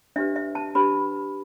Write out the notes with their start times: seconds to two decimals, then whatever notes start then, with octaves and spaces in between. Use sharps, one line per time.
0.16 D4 G4 B4 E5
0.36 E5
0.55 A5
0.75 D4 G4 B4 B5